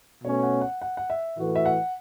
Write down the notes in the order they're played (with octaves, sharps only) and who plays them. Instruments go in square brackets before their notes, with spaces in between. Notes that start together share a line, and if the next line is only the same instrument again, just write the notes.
[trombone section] B2 A3 C#4 [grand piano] C#5
[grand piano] F#5
F#5
F#5
F#5
E5
[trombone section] A2 E3 A3 F#4
[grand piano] E5
F#5